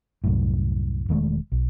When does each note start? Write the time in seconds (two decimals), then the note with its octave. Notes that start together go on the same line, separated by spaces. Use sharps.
0.24 C2 F#2 A2
1.09 E1 D#3 G#3 A3
1.52 B1